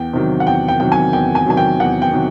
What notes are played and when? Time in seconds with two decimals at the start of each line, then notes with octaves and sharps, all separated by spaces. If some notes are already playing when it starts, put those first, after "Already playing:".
Already playing: E2 G5
0.13 C3 D#3 F#3
0.40 F#5
0.47 E2 G5
0.68 G5
0.80 C3 D#3 F#3 G5
0.92 G#5
1.13 E2 G5
1.35 G#5
1.46 C3 D#3 F#3 G#5
1.57 G5
1.80 E2 F#5
2.02 G5
2.13 C3 D#3 F#3